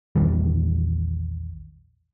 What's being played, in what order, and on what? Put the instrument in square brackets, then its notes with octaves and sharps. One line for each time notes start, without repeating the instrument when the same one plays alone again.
[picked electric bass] A#1 E2 D#3 G3